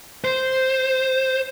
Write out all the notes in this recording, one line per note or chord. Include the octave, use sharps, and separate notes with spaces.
C5